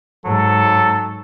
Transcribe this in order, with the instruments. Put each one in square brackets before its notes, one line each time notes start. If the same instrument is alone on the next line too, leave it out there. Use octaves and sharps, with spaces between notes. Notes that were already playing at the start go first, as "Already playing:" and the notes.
[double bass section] G#2 [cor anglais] F#3 [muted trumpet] A4